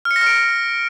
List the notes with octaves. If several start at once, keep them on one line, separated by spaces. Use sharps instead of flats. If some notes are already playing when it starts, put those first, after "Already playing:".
F6
C#7
A#6
F6
D7